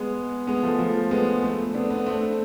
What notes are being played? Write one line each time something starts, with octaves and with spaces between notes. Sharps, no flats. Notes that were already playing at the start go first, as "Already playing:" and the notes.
Already playing: G#3 B3
G#3 B3
F3 A3
F3 A3
G#3 B3
A3 C4
B3 D4
B3 D4
A3 C4